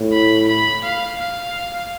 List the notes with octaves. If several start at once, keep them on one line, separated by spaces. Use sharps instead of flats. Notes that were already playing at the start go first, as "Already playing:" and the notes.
Already playing: A2
B5
B5
F5
F5